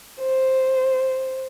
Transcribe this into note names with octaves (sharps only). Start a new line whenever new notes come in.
C5